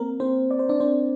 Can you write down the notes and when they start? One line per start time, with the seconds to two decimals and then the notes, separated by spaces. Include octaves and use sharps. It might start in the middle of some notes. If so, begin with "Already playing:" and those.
Already playing: A#3 C4 A#4
0.20 C4 C5
0.51 D5
0.59 C5
0.69 D4 D5
0.80 C4 C5